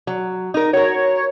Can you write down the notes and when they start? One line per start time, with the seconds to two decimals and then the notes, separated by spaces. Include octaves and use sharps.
0.07 F#3
0.54 D#4 A#4
0.73 F#4 A#4 C#5